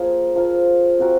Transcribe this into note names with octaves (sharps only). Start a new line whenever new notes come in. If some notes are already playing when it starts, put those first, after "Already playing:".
Already playing: F3 A#3 F4 G#4
F3 A#3 F4
C4 F#4 A#4